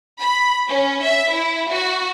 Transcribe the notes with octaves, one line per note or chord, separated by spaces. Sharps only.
B5
C#4
E5
E4
F#4